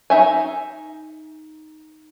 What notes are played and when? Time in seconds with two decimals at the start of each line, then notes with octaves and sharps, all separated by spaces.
0.10 D#4 E5 G#5